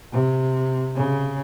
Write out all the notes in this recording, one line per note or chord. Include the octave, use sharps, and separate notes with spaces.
C3
C#3